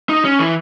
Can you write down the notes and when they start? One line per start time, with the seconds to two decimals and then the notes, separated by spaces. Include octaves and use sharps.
0.09 D#4
0.25 C#4
0.39 E3